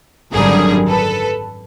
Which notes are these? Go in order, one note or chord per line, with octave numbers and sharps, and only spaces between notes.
G#1 F#2 D3 G3 G#4 A#4
A4 B4